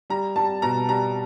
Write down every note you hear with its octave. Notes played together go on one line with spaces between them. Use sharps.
G3 A#5
G3 A5
B2 A#5
G3 A#5